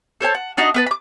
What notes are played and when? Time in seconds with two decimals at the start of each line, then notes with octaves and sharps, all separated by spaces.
0.21 A4 C5 C#5 A5
0.35 F#5
0.57 D4 D#4 F#4 D#5
0.74 B3 B4 A5
0.86 B5 D6